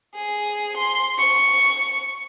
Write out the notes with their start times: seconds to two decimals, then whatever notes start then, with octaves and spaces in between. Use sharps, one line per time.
0.14 G#4
0.77 C6
1.18 C#6